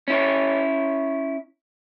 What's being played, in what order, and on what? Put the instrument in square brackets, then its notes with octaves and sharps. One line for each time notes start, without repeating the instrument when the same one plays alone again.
[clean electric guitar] C#4 E4 C#5